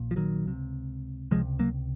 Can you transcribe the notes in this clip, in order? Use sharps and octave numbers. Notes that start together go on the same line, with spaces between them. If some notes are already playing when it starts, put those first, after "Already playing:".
Already playing: A#1 A#2
F3
D#3 F#3
C#2 C3
C#2 C3 F3 G#3
F#3 A#3